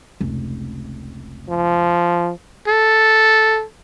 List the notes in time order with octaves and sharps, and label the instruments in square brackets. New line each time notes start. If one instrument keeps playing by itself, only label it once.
[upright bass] F1 C#2
[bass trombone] F3
[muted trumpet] A4